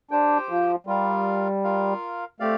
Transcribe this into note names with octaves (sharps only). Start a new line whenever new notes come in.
D4 G4 C5 G5
F3
G3 F4 A#4 F5
F4 A#4 F5
A3 C4 G4 D5 F5